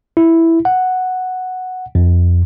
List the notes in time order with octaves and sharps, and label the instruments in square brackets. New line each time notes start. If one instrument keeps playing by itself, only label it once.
[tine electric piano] E4
F#5
F2